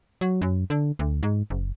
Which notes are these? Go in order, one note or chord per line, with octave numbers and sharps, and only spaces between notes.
F#3
F#2
D3
D2
G#2
F#1